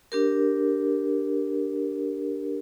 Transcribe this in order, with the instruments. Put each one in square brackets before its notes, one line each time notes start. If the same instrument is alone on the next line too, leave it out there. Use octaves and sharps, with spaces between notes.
[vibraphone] D4 G4 A#4